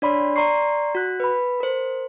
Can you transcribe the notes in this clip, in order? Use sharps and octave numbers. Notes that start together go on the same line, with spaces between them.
D4 C#5 D5 B5 C6
D5 A#5 C6 C#6 C7
F#4 F#6
B4 B5
A#4 C5